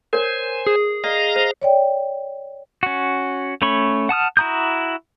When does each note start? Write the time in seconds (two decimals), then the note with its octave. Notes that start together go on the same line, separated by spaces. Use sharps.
0.13 A#4 C5 C#5 G#5
0.67 G#4
1.04 D5 D#5 F5 A#5
1.36 C5
1.62 C#5 D5 G5
2.83 C#4 F#4
3.62 A3 C#4 C#5 B5 C#6
4.09 F#5 A5 D#6 F6
4.37 E4 F#4 A#5 D#6 G6